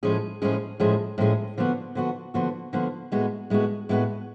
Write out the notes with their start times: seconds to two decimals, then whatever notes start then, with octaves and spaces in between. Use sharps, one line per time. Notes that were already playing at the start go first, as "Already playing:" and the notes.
0.03 A2 F3 G#3 C#4 G#4
0.42 A2 F3 G#3 C#4 G#4
0.80 A2 F3 G#3 C#4 G#4
1.18 A2 F3 G#3 C#4 G#4
1.58 D3 F3 B3 F#4
1.95 D3 F3 B3 F#4
2.34 D3 F3 B3 F#4
2.73 D3 F3 B3 F#4
3.12 A2 G#3 B3 F#4
3.50 A2 G#3 B3 F#4
3.89 A2 G#3 B3 F#4